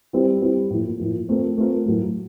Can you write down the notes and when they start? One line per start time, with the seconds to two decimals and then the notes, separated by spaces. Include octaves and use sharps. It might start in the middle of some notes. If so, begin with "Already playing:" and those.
0.13 G3 C4 E4 G4
0.42 G3 C4 E4 G4
0.70 A2 F3 A#3
0.99 A2 F3 A#3
1.29 A3 C4 F4 A#4
1.58 A3 C4 F4 A#4
1.86 A2 F#3 A3